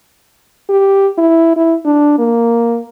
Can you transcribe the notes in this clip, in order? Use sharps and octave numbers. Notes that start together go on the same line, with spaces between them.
G4
E4
E4
D4
A#3